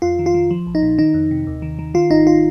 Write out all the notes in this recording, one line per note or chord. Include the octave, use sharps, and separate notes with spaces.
F2 F4
D#3
F4
D#3
F3
A#1
D#4
A#2
D#3 D#4
F2
C3
D#2
D#3
D#3
D#3 F4
G#1 D#4
F4